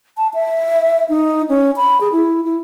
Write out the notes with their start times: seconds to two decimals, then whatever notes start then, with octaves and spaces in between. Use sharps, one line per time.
0.17 A5
0.34 E5
1.09 D#4
1.49 C#4
1.76 B5
2.01 G#4
2.12 E4
2.44 E4